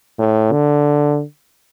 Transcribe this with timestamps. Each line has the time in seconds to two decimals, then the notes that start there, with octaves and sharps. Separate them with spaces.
0.18 A2
0.52 D3